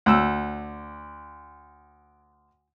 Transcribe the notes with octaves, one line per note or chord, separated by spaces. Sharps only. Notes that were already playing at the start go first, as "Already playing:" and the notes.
D2 E6